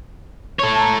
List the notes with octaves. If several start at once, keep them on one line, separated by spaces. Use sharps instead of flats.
A4 C#5
A5 A#5